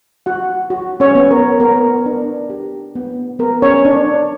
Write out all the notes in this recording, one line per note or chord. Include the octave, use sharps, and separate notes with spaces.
F#4 F#5
F#4
C#4 C#5
B3
A#4
B3 A#4
D4
G4
B3
B3 A#4
C#4 C#5
D4